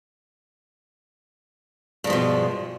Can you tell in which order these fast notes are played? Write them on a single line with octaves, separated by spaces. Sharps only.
G2 G#3 F3 B2